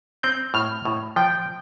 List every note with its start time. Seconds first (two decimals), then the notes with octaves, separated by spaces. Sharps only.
0.23 C4 G6
0.54 A2 F6
0.85 A2
1.16 F3 G5